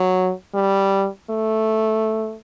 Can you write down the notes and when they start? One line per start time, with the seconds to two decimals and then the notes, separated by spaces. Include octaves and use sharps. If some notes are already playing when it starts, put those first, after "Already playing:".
Already playing: F#3
0.54 G3
1.30 A3